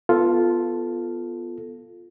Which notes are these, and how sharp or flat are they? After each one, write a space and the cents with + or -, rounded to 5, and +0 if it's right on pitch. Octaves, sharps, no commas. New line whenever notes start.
B3 +0 F4 +0 A4 +0